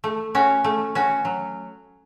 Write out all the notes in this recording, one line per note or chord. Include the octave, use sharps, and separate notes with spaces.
A3
C#4 F#4
A3
C#4 F#4
F#3